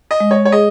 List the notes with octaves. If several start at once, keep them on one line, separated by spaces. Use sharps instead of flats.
D#5
G#3
C#5
C#5
G#4 D#5